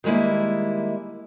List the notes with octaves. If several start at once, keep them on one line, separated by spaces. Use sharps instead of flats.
D#3 G3 G#3 A#3 E4